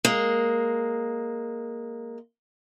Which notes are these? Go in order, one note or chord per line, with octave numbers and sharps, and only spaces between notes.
G#3 A#3